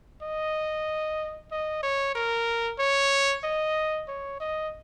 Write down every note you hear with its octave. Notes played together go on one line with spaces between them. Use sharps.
D#5
D#5
C#5
A#4
C#5
D#5
C#5
D#5